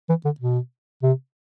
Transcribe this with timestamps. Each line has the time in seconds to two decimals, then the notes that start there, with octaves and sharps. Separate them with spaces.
0.09 E3
0.25 D3
0.40 B2
1.03 C3